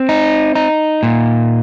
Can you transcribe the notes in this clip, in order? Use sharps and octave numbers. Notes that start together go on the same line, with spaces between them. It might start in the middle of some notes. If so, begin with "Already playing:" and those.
Already playing: C4
D#4
D#4
A#2